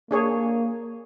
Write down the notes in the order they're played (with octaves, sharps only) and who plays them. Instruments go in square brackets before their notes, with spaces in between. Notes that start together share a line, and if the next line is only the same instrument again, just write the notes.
[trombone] A#3 [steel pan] D4 G#4 C#5